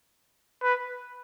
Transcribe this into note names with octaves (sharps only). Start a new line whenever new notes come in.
B4